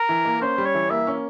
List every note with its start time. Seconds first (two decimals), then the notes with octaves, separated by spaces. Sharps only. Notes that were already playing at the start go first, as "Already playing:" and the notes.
Already playing: A#4
0.09 E3
0.25 A#3
0.41 C#4 C5
0.58 G3
0.65 C#5
0.75 E3
0.90 A#3 E5
1.07 C#4